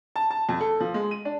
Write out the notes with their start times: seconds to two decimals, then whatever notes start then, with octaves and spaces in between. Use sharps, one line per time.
0.16 A5
0.31 A5
0.49 F2
0.61 A4
0.80 F3
0.94 G#3
1.11 D#7
1.25 D4